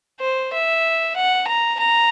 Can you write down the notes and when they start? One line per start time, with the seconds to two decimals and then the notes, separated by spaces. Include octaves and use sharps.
0.20 C5
0.53 E5
1.16 F#5
1.47 A#5
1.79 A#5